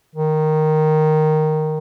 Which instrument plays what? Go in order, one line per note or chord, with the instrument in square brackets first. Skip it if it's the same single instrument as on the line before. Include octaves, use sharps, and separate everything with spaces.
[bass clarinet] D#3